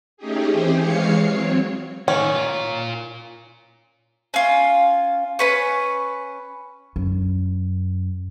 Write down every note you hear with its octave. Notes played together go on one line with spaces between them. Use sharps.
A3 C#4 D#4 G4 G#4
E3 C4 G4 G#4 C5
E3 G#3 C#5 F5 C7 C#7
F#3 C4 C#5
A2 D#3 C#4
F4 A#4
C#4 F4
C#4 B4 C#6
F#2